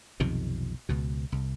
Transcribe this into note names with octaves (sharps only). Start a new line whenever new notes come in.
B1 F2 C3 D#3
C#2 B2
C2